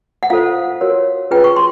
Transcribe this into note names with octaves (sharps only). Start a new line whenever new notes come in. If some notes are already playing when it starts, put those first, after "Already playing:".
F#5
F4 A4 C5 F5
F#4 A#4 C#5
C#4 F4 G#4 B4 G5
C#6
C6